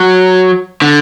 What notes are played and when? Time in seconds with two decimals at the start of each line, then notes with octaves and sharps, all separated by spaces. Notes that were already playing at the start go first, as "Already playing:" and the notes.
Already playing: F#3
0.82 D3